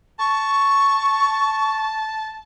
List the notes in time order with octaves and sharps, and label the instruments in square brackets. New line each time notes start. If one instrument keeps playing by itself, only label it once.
[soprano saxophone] A5 [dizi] C#6